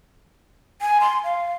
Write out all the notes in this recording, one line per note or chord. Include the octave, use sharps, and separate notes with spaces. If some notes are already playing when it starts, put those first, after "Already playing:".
G#5
C6
F5